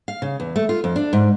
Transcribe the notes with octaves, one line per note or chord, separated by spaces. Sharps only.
F5
C#3
E2
A3
F4
F2
D4
G#2